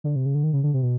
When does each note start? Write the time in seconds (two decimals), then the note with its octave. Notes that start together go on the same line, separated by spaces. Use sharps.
0.04 D3
0.16 C3
0.26 C#3
0.35 D3
0.43 D#3
0.53 C#3
0.64 D3
0.74 C3
0.83 B2